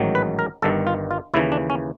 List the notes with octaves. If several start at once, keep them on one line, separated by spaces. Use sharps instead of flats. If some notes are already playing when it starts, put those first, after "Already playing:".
Already playing: A1 G#2 D#3 F#3
B4
A#4
G1 G2 D#3 A4
F4
F4
D#2 C#3 E3 E4
D4
C#4